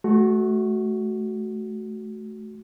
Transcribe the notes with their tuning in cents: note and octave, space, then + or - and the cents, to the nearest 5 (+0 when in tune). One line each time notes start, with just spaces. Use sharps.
A3 -25 F#4 +5